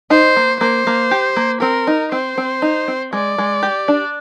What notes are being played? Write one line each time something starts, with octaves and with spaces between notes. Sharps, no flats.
D#4 C5
A#3
A#3 C5
A#3
G4
A#3
C4 A#4
D#4
C4 C5
C4
D#4
C4
G#3 D5
G#3
G4
D4